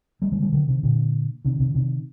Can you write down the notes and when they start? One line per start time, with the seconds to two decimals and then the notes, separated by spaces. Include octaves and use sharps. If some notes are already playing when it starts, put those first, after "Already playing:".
0.22 G3 A#3
0.32 D#3 G3
0.42 D#3 G3
0.52 D3 F#3
0.68 C3 D#3
0.83 A#2 D3
1.45 C3 D#3
1.60 C3 D#3
1.74 C3 D#3